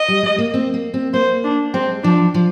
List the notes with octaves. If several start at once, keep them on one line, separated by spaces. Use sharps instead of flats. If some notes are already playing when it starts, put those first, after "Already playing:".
Already playing: D#5
G3
G#3
A#3
C4
A#3
C4
A#3 C5
D4
G#3 C4
F3 D4
F3